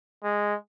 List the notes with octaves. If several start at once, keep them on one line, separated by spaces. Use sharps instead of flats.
G#3